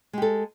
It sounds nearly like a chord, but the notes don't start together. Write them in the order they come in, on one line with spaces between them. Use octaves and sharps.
G#3 G4 A4